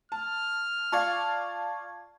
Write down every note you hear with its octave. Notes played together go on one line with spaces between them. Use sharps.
A5 F6
F4 D5 F5 A5 C#6 G#6